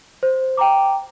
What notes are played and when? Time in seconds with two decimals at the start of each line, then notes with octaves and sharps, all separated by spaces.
0.23 C5
0.57 G5 A#5 D6